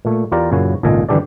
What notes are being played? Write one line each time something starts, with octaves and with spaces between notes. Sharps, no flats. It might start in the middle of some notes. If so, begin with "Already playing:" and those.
A#2 A3
E2 F4 G4 A#4 D5 A#5
F#2 A#2 C#3 E4 F#4 G#5
G#1 C#2 A#2 A4 D#5 G#5
G2 D3 E3 G4 A4 D5